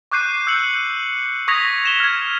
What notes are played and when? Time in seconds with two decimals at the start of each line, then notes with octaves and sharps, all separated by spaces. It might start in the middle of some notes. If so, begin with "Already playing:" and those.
0.11 C#6 D6 F#6 G6 C7 D#7
0.47 E6 G6 C#7 F#7
1.48 C#6 D#6 G#6 A#6 B6 F7
1.84 A#6 E7 G7
2.00 F6 G#6